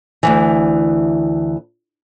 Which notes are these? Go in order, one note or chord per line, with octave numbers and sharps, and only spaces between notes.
D2 G2 E3